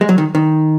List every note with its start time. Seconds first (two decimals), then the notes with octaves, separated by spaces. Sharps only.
0.01 G#3
0.09 F#3
0.18 D#3
0.35 D#3